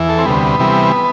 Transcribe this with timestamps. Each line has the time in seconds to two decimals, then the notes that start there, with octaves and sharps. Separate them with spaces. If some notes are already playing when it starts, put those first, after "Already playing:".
Already playing: E2 E3
0.09 A4
0.18 C4
0.25 D2 C3 G3 B3
0.59 C3 E3 G3